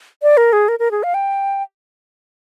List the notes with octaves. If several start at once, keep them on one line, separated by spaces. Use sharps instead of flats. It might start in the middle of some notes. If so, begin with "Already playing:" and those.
D5
A#4
G#4
A#4
A#4
G#4
F5
G5